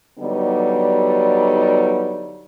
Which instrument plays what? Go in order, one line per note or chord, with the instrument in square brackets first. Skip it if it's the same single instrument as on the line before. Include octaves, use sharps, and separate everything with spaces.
[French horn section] D3 F#3 G3 B3 D#4